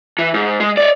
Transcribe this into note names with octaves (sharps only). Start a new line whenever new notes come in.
E3
G#2
G#3
C#5 D5